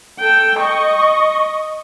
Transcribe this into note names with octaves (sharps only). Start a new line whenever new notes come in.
A4 G5
D#5 C#6